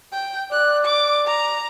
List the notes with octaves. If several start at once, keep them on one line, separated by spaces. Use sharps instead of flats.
G5
D5 F#6
D6
A#5